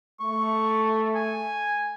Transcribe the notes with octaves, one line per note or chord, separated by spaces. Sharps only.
A3 C#6
G#5